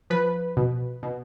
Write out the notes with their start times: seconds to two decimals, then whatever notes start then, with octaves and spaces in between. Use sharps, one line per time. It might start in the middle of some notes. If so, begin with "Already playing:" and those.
0.10 F3 B4
0.57 B2
1.03 B2